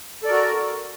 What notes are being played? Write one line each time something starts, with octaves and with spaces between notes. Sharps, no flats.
F#4 A4 A#4 D5 A#5